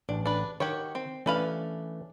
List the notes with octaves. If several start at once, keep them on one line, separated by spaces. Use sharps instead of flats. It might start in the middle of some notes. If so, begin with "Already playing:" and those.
A1 D4
D4 B4
D#3 F#4 G4 C#5
C4
E3 A3 C#4 D4 B4 F5